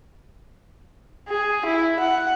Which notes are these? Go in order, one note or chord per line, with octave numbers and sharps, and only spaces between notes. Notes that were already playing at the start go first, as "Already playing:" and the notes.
G#4
E4
F#5